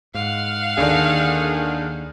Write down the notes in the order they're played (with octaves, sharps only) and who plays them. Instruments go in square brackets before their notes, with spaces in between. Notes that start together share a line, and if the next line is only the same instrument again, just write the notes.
[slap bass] G#2 [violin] F5 F#5
[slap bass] D#2 [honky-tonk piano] D3 D#3 D4 [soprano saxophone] G#4